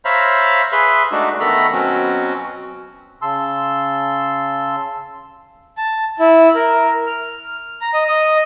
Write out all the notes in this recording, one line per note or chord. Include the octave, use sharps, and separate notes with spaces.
C5 C#5 E5 F5 A#5 B5
G#4 B4 E5 B5 C6
G#3 A3 D4 D#4 F#4
D#3 A3 B3 A4 A#5 B5
B2 F#3 C4 C#4 F#4
C#3 A5 C6 E6
A5
E4
A#4
F6
A#5
D#5
D#5